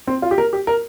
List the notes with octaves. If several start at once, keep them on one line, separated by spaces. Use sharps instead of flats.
C4
F4
G4
A#4
G4
A#4